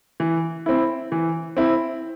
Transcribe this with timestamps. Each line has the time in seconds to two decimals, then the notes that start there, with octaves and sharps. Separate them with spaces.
0.20 E3
0.66 C4 E4
1.12 E3
1.57 C4 E4